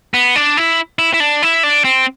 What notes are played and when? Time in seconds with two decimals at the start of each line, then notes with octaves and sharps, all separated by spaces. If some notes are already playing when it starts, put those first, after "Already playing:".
0.14 B3
0.36 D4
0.57 E4
0.99 E4
1.14 E4
1.20 D4
1.42 E4
1.63 D4
1.85 C4